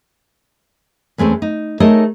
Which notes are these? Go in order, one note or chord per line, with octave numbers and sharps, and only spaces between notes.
E2 G#3 A3 C4 C#4
D#4
A3 D#4 G#4 A#4 C#5 D#5